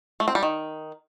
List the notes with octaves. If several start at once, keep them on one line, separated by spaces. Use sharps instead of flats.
A3
C4
G3
D#3